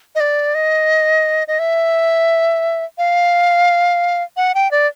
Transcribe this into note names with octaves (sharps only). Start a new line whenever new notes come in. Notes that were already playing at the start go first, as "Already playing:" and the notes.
D#5
D5
D#5
D#5
E5
F5
F#5
G5
D5